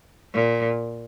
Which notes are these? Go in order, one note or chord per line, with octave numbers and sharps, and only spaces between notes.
A#2